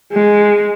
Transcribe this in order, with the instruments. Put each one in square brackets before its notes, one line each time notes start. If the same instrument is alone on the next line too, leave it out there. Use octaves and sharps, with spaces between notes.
[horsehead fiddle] G#3